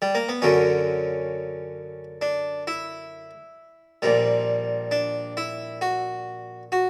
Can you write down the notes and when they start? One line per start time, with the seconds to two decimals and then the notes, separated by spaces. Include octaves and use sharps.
0.02 G3
0.15 A#3
0.29 B3
0.42 F#2 D3 F#3 C#4
2.22 D4
2.67 E4
4.02 A#1 A#2 G3
4.91 D4
5.37 E4
5.81 F#4
6.72 F#4